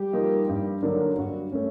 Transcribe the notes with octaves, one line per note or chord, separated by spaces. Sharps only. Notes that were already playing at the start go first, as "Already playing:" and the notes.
Already playing: G3 G4
F3 A#3 D#4
G2
D3 F#3 A#3 D4
G2 F#3 F#4
A3 C#4